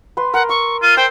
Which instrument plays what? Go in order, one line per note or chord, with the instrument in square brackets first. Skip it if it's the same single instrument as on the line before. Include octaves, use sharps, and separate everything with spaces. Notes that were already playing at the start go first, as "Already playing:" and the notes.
[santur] B4 C6
[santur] A#4 [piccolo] F#5
[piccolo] C#6 [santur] E6
[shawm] F4 [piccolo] D#7
[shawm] C5 [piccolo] G5 [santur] E6